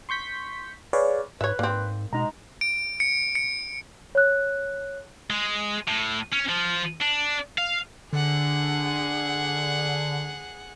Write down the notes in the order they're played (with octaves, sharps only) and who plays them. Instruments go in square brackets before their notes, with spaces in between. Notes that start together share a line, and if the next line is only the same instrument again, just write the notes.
[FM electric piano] C6 C#6 G6 B6
G#4 B4 C#5 D5 F5
[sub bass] G#2 [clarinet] B4 [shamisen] C#5 E5
[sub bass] G#2 [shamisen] A#3 C4 [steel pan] D5
[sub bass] B2 [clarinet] G#3 [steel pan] D#4 F#5 A#5
[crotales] D7
C#7
C#7
[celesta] C#5 F#6
[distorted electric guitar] G#3
A2
C#4
F3
D4
F5
[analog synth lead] D3 [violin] G#4 F#5